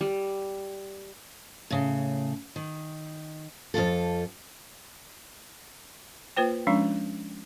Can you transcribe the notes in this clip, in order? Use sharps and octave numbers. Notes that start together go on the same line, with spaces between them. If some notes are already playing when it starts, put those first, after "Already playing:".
G3
A2 C#3
D#3
F2 A#2 F4 A4
A#3 F4 B4 C5 G5
F3 G#3 C#4 D4